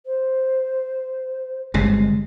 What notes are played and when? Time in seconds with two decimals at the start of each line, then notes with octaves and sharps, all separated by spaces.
0.06 C5
1.74 G1 C3 G#3